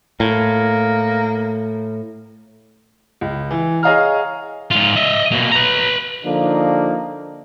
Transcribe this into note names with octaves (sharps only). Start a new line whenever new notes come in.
A2 A#3
C#2
E3
G#4 C#5 D#5 F5 A#5 F6
G#2 F4
D#5 E5
B2 A#3
B4 A#5
D3 F3 A#3 D4 D#4